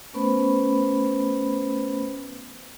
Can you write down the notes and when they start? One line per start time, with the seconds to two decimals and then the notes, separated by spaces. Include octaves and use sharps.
0.13 A3 B3 C#4 B4 C5 B5